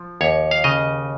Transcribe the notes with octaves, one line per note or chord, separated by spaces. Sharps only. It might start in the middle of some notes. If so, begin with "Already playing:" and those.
Already playing: F3
D#2 C#5
F5
C#3 D#5